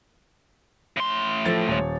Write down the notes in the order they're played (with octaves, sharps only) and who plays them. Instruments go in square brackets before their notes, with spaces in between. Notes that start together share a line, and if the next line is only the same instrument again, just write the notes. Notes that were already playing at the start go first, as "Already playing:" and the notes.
[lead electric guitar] A2 C6
[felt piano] F3 A4 A6
D#1 C#5